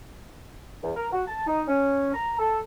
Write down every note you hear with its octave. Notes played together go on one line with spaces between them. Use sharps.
E2
A#4
F#4
A5
D#4
C#4
A#5
A4